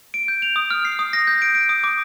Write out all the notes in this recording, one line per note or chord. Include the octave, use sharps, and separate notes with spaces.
D7
G6
F7
D#6
F6
C7
D#6
A#6
G6
D7
D7
D#6
D6